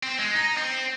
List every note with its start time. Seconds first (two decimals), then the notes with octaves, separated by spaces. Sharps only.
0.03 C4
0.19 G#3
0.34 D#4
0.57 C4